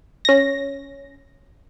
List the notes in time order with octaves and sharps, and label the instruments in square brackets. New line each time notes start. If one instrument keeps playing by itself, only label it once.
[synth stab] C#4 A#6